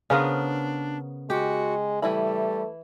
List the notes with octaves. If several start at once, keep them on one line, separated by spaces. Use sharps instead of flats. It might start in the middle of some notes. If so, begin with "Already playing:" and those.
C#3 B3 D4 A#4 C5 F5 G#5
G#3 F#4 G4
E3 G3 A3 E4 B5